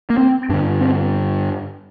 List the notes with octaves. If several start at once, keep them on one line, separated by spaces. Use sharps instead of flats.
A#3
C4
G2 D3 D4
C4